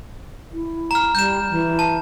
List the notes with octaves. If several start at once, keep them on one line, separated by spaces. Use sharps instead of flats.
E4
A#5 F6
G3 G6 E7
E3
A5